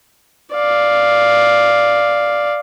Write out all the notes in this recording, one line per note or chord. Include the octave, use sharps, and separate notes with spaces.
D5 F5